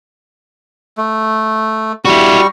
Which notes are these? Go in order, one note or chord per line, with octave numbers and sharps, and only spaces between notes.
A3
G3 E4 F#4 C#6